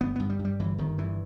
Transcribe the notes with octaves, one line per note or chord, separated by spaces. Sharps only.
G1 B3
G2 B3
G3
G2
G3
G1 E3
G1 D#3
G2 E3